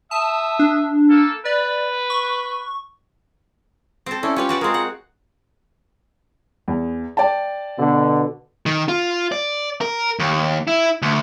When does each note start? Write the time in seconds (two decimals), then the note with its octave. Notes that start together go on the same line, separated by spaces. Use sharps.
0.11 E5 A5 D#6
0.59 D4
1.09 A#3 A4
1.45 B4 D5
2.10 C#6
4.06 C4 A4
4.23 C#4 E4 A4 D5
4.36 C#4 F4 G4 B4 C#5
4.49 F#4 B4 D5
4.61 G#3 C4 F4 G#4 A#4
4.74 F#5
6.68 E2
7.17 D5 G5 A5
7.78 B2 D3
8.66 D#3
8.88 F4
9.32 D5
9.81 A#4
10.19 D#2
10.67 E4
11.02 D2